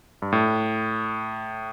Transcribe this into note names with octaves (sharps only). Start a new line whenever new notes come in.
G2
A2